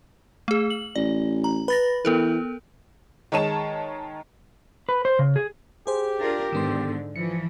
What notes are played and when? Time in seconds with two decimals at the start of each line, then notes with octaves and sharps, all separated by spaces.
0.48 A3 G#4
0.70 F#7
0.96 A1 D5
1.44 A#5
1.68 B4 B5 A6 A#6
2.05 E3 B3 A4 A#4
3.32 D#3 G#3 C#5 A5 E7
4.89 B4
5.05 C5
5.19 C#3
5.36 G#4
5.87 G4 G#4 C5
6.19 D4 F4 A#4
6.53 G#2 D3 D#3 B3 C6
7.16 E3 F3 C#7